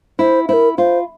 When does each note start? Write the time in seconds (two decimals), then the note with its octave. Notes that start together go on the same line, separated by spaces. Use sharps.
0.19 E4 C5
0.49 E4 A#4 C5
0.78 F4 C5